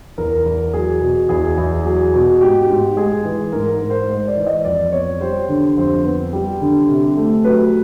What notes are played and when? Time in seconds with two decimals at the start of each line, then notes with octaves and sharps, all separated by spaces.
0.18 E2 A#4
0.46 E2
0.73 F#3 G#4
1.01 B2
1.29 E2 G#4
1.58 E2
1.85 F#3 G#4
2.14 B2
2.41 G#2 G4
2.69 G#2
2.97 G#3 G#4
3.25 E3
3.53 G#2 A#4
3.72 A#4
3.81 G#2
3.90 C5
4.09 G#3 C5
4.28 D5
4.37 E3
4.47 D#5
4.65 F2 D5
4.92 B3 C#5
5.21 G3 C5
5.49 D3
5.77 F2 C5
6.05 B3
6.33 G3
6.61 D3
6.89 C3
7.17 A3
7.44 F#3 B4